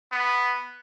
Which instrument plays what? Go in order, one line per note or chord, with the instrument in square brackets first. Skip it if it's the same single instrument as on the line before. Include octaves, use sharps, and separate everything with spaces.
[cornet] B3